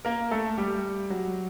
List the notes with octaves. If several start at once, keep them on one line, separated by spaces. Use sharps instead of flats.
A#3 A#4
A3 A4
G3 G4
F#3 F#4